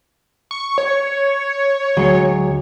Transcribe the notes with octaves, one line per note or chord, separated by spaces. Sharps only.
C#6
C#5
D2 F#3 G#3